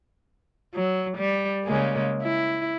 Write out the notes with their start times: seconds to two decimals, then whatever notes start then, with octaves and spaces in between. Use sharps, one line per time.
0.75 F#3
1.17 G3
1.65 C#3 G#3 A#3
2.23 E4